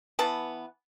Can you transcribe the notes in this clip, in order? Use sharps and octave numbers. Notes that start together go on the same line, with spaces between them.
E3 B3 A5